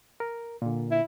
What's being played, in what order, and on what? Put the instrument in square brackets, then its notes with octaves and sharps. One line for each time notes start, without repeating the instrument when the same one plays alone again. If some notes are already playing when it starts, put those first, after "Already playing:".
[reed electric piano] A#4
A#2 D3
[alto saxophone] E4